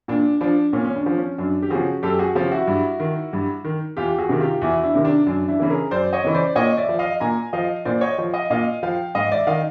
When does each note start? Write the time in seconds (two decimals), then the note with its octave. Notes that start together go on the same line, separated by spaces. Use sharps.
0.08 A#2 D4
0.41 F3 D4
0.73 A#2 C#4
0.85 C#4
0.95 D4
1.06 F3
1.17 C#4
1.38 F#2 D4
1.62 G4
1.70 C#3 F3 F#4 G#4
2.03 F#2 G4 A4
2.19 F#4 G#4
2.35 C#3 F3 F4 G4
2.51 E4 F#4
2.67 G2
3.00 D#3
3.33 G2
3.65 D#3
3.97 E2 F4 G4
4.19 F#4 G#4
4.29 C3 D#3
4.40 F4 G4
4.61 E2 E4 F#4
4.83 D4 E4
4.95 C3 D#3
5.05 D4
5.27 F#2 D4
5.48 D4 E4
5.60 C#3 E3
5.70 G#4 A#4
5.91 F#2 C5 D5
6.13 C#5 D#5
6.24 C#3 E3
6.34 C5 D5
6.56 A#2 C#5 D#5
6.77 D5 E5
6.89 F3
6.99 D#5 F5
7.20 A#2 G#5 A#5
7.53 F3 D#5 F5
7.85 A#2 C5 D5
8.01 C#5 D#5
8.18 F3
8.34 D#5 F5
8.50 A#2 D#5 F5
8.83 F3 F5 G5
9.15 G#2 D#5 F5
9.32 D5 E5
9.47 D#3 D#5 F5